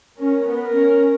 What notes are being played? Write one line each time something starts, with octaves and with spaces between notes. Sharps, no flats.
C#4 A#4
B3
A#4
C#4